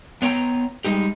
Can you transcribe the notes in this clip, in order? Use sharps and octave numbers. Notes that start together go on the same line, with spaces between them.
B3 C#5 G5 A#5
G3 G#3 D#4 G4